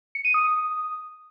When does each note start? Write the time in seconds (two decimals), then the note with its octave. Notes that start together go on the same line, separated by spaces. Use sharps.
0.15 C#7
0.25 D#7
0.34 D#6